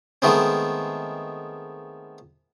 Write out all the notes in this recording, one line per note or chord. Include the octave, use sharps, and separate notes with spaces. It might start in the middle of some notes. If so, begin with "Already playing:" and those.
D#3 G#3 A3 B3 C4